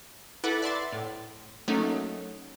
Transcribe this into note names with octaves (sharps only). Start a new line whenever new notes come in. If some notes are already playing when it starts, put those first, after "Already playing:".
E4 A4 B4 F#5 D6
D5 E5 C6 A6
A2
F#3 A3 A#3 C#4 D#4